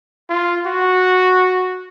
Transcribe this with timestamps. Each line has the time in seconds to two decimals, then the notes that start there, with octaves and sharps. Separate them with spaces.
0.30 F4
0.66 F#4